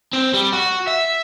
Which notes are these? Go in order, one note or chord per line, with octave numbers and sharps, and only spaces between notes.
C4
G3
F#4
E5